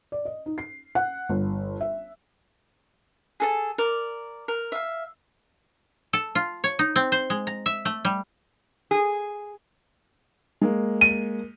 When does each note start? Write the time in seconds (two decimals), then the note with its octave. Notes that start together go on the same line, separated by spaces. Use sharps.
0.12 D5
0.25 D#5
0.46 D#4
0.58 C7
0.95 F#5
1.29 G1
1.81 E5
3.40 G#4 A4 A5
3.78 A#4 D5
4.48 A#4
4.72 E5 F5
6.13 A4
6.35 F4
6.64 C#5
6.79 D#4
6.96 C4
7.12 C5
7.30 G#3
7.47 A#5
7.66 E5
7.85 A3
8.05 G3
8.91 G#4
10.61 G#3 A#3
11.01 D#7